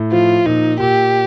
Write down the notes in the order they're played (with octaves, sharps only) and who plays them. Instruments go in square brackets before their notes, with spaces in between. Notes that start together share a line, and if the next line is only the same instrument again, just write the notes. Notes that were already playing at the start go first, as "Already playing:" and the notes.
Already playing: [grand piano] A2
[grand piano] F3 [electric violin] F4
[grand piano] A#2 [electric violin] D#4
[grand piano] A#2 [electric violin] G4